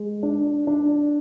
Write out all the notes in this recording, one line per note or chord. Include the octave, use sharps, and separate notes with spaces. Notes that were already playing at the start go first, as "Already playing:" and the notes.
Already playing: G#3
D4
D4